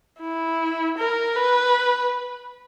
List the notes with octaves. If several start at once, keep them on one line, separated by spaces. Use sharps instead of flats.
E4
A#4
B4